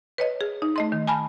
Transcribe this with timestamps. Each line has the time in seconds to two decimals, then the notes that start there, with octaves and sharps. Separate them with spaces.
0.18 B4 C#5 D#5
0.41 G#4
0.62 D#4
0.76 A3 D#5 C6
0.92 D#3
1.07 G#5 A5 B5 F6